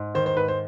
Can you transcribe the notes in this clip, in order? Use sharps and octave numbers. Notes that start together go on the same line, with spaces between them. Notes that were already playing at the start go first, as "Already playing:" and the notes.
Already playing: G#2
D#3 C5
C5
G#2 B4
C5